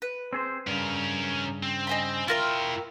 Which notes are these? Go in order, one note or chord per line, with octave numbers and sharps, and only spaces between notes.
B4
C4 G#4 C5
G2 C#3 C#4 A#4
C4
D#5 G#5 B5
E4 F4 A#4 E5 G5